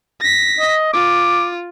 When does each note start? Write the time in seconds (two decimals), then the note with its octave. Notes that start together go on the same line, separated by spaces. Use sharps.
0.20 A#6 B6
0.59 D#5
0.93 F4 D6